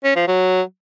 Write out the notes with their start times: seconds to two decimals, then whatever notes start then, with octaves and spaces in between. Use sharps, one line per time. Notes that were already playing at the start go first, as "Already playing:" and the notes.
0.04 C#4
0.16 F3
0.27 F#3